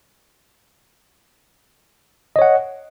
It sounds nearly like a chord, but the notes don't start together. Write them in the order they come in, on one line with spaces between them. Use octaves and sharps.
D#5 C#5 F#5